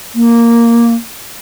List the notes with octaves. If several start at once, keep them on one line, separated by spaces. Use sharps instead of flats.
A#3